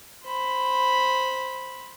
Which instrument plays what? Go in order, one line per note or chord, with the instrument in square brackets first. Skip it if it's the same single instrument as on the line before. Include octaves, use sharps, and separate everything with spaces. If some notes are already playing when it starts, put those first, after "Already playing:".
[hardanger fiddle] C5 B5